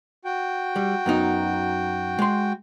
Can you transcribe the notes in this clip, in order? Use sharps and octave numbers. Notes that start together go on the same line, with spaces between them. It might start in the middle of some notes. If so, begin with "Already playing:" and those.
F#4 G5
G3
F#2 B3 D#4
G#3 C6